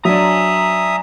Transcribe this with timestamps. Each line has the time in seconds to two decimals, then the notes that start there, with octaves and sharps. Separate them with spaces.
0.05 F#3 D4 E5 G#5 A#5 D#6